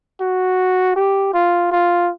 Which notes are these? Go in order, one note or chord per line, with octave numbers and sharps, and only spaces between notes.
F#4
G4
F4
F4